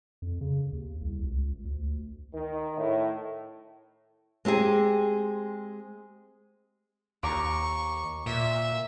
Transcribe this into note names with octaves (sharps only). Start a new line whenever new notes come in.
F2
C#3
D#2
C2
C#2
D2
D#3
A2
G#3 C4 G4 G#4
D#2 A#5 C#6 D6
A#2 E5